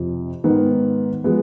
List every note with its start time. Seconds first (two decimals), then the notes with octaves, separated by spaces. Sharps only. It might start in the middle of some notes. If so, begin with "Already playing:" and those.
Already playing: F2 C3 F3
0.44 G#2 D#3 B3
1.24 F3 G#3 B3